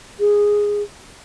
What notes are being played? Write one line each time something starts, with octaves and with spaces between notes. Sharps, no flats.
G#4